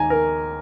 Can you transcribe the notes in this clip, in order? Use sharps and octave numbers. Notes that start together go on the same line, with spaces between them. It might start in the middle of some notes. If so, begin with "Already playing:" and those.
Already playing: D#2 D#3 G#3 G#5 A#5
A#4